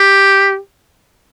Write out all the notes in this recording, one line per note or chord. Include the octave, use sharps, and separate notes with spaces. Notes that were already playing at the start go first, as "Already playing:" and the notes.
Already playing: G4